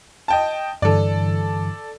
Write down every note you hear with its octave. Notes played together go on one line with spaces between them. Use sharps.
D#5 G5 A5
G2 D3 E3 A4 D5